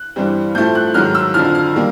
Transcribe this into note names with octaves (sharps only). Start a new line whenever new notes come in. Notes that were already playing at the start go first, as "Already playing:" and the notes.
Already playing: F#6
G2 E3 G3 C4
A2 F3 A3 C4 G6
F#6
G#2 D#3 F#3 F6
E6
F2 D3 F3 F6
F6
D#3 G3 A#3